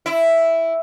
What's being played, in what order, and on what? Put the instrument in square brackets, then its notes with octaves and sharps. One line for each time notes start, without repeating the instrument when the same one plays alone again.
[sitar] E4